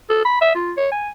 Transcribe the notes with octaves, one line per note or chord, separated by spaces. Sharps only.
A4
B5
E5
F4
C#5
G#5